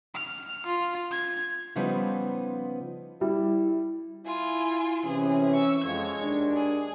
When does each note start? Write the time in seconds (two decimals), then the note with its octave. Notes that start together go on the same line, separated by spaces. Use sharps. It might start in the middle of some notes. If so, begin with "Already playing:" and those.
0.15 F6
0.66 F4
1.12 G#6
1.75 C#3 F3 G3 B3 D#4 C5
3.21 G3 E4
4.26 E4 F4 G#5
5.05 C3 E3 C#4 G#4
5.54 C#6 E6
5.84 F2 G#3 C#5 G#6
6.21 D#2 D#3 D4
6.57 G#4